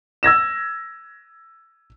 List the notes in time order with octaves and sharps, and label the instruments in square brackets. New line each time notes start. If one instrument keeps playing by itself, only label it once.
[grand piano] E6 G#6 A#6 E7